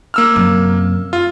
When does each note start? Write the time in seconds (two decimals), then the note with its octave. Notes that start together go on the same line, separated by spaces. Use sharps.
0.14 A#3 E6 F6
0.36 F#2 C3
1.13 F4